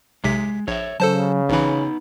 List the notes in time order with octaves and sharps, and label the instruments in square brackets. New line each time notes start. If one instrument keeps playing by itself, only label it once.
[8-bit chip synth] B1 C3 B6 [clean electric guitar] G#3
[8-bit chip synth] A#1 [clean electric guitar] C#5 E5
[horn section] C#3 [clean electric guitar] F#3 [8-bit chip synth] A4 C5 A5
[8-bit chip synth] A1 E3 [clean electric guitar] B3 D#4 B5